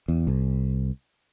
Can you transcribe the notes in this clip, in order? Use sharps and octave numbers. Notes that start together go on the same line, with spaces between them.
E2
C2